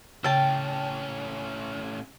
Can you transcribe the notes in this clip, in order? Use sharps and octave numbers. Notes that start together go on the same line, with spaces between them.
A2 C#3 C#4 G5 A5